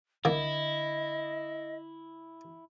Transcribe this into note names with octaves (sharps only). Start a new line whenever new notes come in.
C2 D3 D#3 A#3 E4 D#5